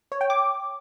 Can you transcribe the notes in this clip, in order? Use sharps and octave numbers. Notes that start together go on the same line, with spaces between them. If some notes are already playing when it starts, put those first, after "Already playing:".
C#5
G5
D6